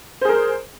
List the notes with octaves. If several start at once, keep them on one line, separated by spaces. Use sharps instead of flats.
G#4 A#4 C5